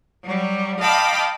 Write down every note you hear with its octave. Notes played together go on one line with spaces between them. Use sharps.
F#3 G3
D#5 F5 G5 A5 B5 D6